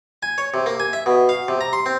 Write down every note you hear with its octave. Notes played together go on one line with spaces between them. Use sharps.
G#5
C#5
C3
A#3
G#5
E5
B2
F5
C3
A#5
C6
C4